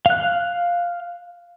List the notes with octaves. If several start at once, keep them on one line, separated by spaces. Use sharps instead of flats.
F5 F#6